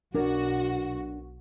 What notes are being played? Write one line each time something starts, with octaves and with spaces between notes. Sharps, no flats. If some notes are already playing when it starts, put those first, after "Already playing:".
B1 D4 F#4 A#4 C#5